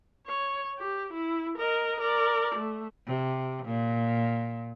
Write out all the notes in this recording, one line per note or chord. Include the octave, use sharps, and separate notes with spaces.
C#5
G4
E4
A#4 D#5
A#4 D5
A3
C3
A#2